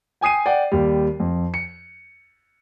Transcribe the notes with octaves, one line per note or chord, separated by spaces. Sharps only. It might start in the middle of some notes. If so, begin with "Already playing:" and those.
G5 G#5 D#6 C7 D#7
D5 F#5 G5
D#2 G3
F2
C#7